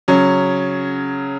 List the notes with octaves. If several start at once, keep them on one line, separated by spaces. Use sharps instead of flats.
C#3 F#3 C#4